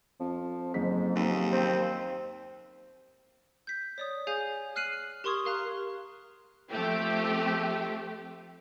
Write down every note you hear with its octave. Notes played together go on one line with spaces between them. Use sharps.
F2 F3
F#1 G#2 B6
D#2
C4
G6 B6
C#5 D5 D#6
G#4 C#5 F5 G#5 G6
F6 F#6 C7 D#7 F#7
G4 A#4 C6 C#6 D#6 G#6
A#4 F5 A#5 F#6
F3 A3 C4 G4